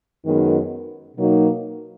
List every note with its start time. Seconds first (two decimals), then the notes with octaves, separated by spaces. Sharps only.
0.26 F#2 D#3 G#3 B3 F#4
1.16 B2 F#3 A#3 D#4